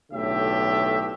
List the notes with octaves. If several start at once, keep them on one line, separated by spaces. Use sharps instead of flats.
B1 A2 D3 G4 E5